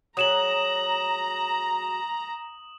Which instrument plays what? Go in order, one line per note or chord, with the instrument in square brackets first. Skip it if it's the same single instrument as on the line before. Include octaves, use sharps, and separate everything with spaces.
[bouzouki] F#3 G#4 [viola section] A#5 [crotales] D#6 E7 F#7